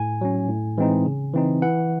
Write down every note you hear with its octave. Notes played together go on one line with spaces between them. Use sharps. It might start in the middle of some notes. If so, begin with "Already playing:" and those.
Already playing: A2 G#5
F#3 C#4
A2
E3 G#3 C4 D#4
C#3
E3 C4 D#4
E3 F#5